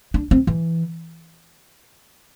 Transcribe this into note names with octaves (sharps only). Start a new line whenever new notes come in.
D4
C4
E3